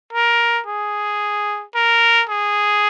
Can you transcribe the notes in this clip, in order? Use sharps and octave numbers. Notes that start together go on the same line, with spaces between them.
A#4
G#4
A#4
G#4